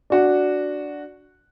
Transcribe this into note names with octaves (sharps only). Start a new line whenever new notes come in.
D4 F#4